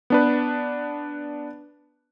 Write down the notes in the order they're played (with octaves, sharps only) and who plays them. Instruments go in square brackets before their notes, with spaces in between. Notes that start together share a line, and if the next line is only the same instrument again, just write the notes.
[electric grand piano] B3 D4 B4